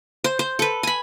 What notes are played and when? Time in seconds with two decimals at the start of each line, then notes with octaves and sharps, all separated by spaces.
0.24 C5
0.39 C5
0.59 A4 B4
0.83 G#5 B5